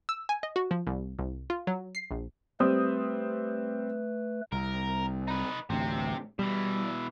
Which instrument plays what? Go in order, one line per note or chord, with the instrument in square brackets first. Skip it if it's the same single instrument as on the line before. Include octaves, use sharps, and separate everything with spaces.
[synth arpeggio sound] E6
G#5
D#5
F#4
F3
C2
C2
F4
F#3
C7
A#1
[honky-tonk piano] G3 C4 D#6 [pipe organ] A3 B4
[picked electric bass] C2 [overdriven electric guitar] A#4
[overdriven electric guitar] D#4 B4
[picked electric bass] A1 D2 [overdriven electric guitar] C3 C4
[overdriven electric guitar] B2 E3 [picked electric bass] G3